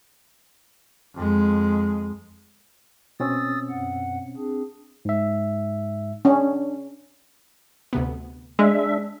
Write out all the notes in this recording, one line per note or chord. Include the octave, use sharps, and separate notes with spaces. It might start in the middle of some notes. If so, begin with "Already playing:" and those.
F2 G#3
B2 C4 C#4 D#6 E6 A6
F#2 F#5
C4 D4 G#4
G#2 E5
C#4 D4
D2 C3 B3
G#3 D4 E5